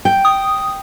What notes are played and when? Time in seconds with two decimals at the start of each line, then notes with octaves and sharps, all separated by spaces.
0.05 G5
0.25 D#6